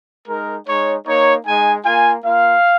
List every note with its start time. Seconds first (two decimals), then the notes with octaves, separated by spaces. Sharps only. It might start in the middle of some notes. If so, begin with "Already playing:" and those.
0.28 G#3 D#4 A#4
0.68 G#3 D#4 C#5
1.06 A#3 D#4 C#5
1.46 G#3 D#4 G#5
1.85 A#3 F4 G#5
2.25 A#3 F4 F5